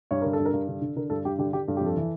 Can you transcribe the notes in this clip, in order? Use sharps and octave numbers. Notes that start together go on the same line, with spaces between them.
G2 C#5
D3 A#4
A4
G2
A#4
G2
D3
D3
D3 A#4
G2 A4
G2 G4
D3 G4
D3 G4
G2 A4
G4
F2 A4
E3